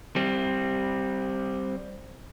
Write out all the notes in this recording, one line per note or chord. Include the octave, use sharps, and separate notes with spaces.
G3 C4